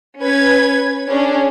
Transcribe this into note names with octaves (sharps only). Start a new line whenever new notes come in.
C#4 B4 G#6
C#4 D4 G#4